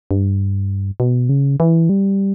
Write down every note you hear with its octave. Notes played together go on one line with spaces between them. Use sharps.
G2
B2
C#3
E3
G3